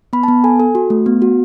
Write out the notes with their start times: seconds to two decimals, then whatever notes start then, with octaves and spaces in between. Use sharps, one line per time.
0.13 B3 B5
0.23 A5
0.28 B3
0.44 A4 G#5
0.60 A4
0.75 F#4
0.90 A3
1.06 B3
1.22 F#4